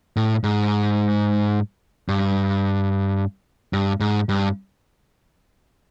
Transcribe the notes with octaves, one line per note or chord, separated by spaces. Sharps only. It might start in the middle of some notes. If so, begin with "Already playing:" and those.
A2
G#2
G2
G2
G#2
G2